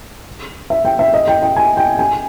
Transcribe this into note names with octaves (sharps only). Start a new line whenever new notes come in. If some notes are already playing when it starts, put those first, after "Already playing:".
E5
G5
E5
D#5
G5
G5
G#5
G5
G#5